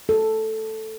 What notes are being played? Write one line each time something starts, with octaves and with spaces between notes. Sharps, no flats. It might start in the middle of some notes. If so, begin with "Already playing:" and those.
A4